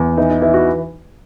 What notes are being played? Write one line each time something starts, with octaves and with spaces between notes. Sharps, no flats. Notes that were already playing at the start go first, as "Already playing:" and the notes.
Already playing: E2
E3 D#4
D#4
E3 E4
F#4